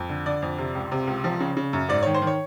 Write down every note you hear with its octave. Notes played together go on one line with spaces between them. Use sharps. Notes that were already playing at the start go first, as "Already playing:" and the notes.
Already playing: F2
D3
D3 D5
F2
C3
C#2
C3
C#2
F3
C#3
C#3
F#2
G#2 D5
D#3 C#5
C5
D#3
C#5